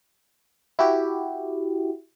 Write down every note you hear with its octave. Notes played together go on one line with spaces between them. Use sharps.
E4 F#4 G4